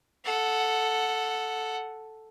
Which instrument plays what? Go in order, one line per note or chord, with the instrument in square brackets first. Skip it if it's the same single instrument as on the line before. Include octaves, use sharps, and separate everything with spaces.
[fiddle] A4 F#5